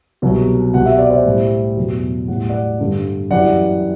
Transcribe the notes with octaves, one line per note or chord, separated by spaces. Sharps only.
C2 B2 F#3
C2 B2 G3 F#5
E5
D5
C5 E5
A2 G3
E2 B2 F#3
A2 G3 F#5
D5 F#5
G2 D3 G3
F#2 E3 G3 D5 F#5